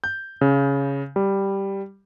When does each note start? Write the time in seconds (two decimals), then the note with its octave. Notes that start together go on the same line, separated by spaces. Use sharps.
0.04 G6
0.41 C#3
1.16 G3